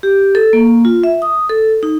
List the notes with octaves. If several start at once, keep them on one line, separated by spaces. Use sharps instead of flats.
G4
A4
A#3
F4
E5
D#6
A4
D#4